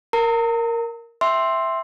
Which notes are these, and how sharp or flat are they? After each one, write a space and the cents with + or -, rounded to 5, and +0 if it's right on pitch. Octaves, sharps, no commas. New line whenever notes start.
A#4 +0 A#5 -40
E5 +0 G5 +0 C6 +10